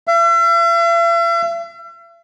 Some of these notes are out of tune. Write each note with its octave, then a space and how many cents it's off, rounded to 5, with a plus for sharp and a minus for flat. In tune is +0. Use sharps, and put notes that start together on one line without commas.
E5 +45